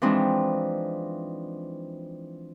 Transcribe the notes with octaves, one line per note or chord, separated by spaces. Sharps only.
E3 F3 G#3 C4 D4 D#4